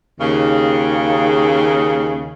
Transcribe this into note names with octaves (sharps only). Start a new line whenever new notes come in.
D#2 C#3